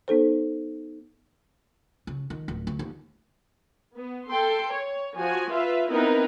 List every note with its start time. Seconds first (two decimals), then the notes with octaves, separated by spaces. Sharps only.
0.08 B3 D#4 A4 C5
2.07 C#3
2.30 D#3
2.48 D1
2.67 D2
2.79 D#2
3.96 B3
4.30 A4 G5 C6
4.73 C#5
5.16 F3 F#4 G#5
5.50 F4 B4 E5
5.89 B3 C4 D#4 E4 A#4 B4